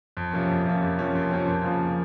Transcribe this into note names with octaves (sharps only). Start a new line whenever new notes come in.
F2
C3 F3 A#3 C#4
F2
C3 F3 A#3 C#4
F2
C3 F3 A#3 C#4
F2
C3 F3 A#3 C#4
F2
C#3 F3 A#3